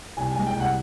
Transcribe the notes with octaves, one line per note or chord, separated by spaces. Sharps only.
C2 G#5
G#3 G#5
G5
C2 F#5